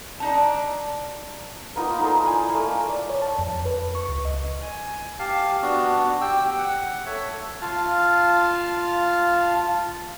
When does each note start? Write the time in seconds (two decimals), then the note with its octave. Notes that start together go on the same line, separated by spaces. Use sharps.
0.20 D4 D#4 A5
1.76 A#3 B3 D#4 F4
1.99 D#4 A4 D5 C6
2.26 E4 G#5
2.54 A3 A#3 D#4
2.90 D5
3.10 C#5
3.22 A5
3.39 F2
3.65 B4
3.95 C#6
4.09 C#2
4.25 D#5
4.62 G#5
5.19 G4 F5 A5
5.62 B3 D4 F#4
6.21 G4 G5 E6
6.58 F#5
7.06 A4 C#5 E5
7.62 F4 F5 A5